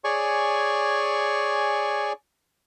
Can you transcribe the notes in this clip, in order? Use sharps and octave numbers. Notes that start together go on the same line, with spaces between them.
G#4 C#5 D5 G#5 C#6